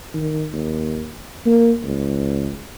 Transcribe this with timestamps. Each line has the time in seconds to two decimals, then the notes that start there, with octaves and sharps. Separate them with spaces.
0.14 D#3
0.53 D#2
1.46 A#3
1.84 C#2